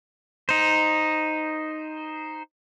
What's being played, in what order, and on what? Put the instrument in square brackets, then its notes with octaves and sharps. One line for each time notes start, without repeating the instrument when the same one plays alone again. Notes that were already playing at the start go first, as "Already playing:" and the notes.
[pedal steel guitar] D#4 C5